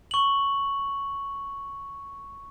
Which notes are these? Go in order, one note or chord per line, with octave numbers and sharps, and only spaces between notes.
C#6 F#7